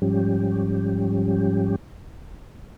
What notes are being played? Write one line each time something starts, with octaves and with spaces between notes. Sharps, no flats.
G#2 F3 G3 C#4 G4